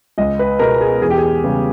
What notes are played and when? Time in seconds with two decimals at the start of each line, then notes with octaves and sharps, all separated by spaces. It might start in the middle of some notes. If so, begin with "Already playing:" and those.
0.18 C#2 D#5
0.39 B4
0.59 B2 G#3 B3 A#4
0.81 G#4
1.02 E2 G#4
1.10 G4
1.18 G#4
1.43 C#3 G3 B3